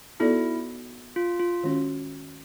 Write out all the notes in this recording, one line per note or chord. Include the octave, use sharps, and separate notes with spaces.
B3 D#4 E4 F#4 A4 D5
F4
F4
D#3 G#3 C#4 F#4